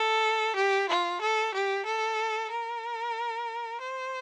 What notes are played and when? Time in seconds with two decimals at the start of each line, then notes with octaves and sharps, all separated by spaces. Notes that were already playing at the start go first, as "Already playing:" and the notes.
Already playing: A4
0.56 G4
0.89 F4
1.21 A4
1.54 G4
1.86 A4
2.51 A#4
3.81 C5